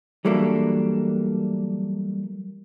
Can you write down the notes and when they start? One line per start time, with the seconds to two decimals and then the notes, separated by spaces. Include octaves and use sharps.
0.25 E3 F#3 G3 A3 A#3 D4